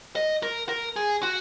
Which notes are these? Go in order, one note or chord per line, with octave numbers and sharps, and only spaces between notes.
D#5
A#4
A#4
G#4
F#4